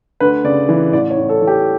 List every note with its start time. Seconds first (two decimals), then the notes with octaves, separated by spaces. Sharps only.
0.20 D2 B4
0.44 C#3 D5
0.69 E3
0.93 A1 D5
1.10 C#5
1.17 A2
1.29 A4
1.41 E3
1.47 G4